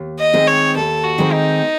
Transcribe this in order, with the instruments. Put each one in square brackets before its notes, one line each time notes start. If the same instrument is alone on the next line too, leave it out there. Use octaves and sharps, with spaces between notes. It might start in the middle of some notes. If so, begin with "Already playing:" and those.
Already playing: [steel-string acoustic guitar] D#2
[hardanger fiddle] D#5
[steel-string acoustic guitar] D#3 G#3 C4
[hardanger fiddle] C#5
[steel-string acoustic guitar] D#2 [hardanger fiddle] A4
[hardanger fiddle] F#4
[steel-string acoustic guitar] D#3 G#3 C4
[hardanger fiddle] D#4